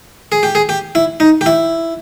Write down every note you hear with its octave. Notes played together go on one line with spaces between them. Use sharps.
G#4
G4
G#4
G4
E4
D#4
G4
E4